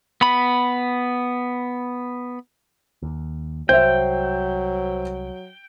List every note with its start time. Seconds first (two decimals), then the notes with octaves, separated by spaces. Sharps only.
0.21 B3 B5
3.03 D#2
3.69 C2 F#3 C5 E5 G5